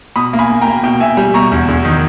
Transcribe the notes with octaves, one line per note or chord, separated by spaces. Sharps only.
B2 B5 D#6
A#3
G#5 B5
A#3
G5 A#5
A#3
B2 G5
B2 E5 G#5
G3
B2 A#5 C#6
E2
E2
D#3